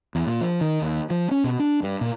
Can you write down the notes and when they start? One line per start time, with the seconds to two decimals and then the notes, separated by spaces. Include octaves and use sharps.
0.15 E2
0.27 A#2
0.41 F3
0.61 D#3
0.82 D#2
1.10 F3
1.31 C#4
1.44 B2
1.59 D4
1.83 G2
2.01 A#2